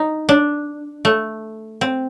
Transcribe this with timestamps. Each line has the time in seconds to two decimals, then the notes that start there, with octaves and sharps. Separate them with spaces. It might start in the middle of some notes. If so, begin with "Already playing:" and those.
Already playing: D#4
0.29 D4
1.05 A3
1.81 C4